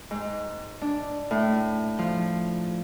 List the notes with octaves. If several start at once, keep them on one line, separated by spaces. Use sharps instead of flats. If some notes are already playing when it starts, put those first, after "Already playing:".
G#2
D4
A2
F3